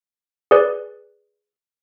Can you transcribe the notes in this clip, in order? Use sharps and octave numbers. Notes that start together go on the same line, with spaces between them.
G#4 B4 D5